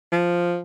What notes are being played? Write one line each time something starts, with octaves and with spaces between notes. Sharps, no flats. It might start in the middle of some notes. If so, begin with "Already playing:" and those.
F3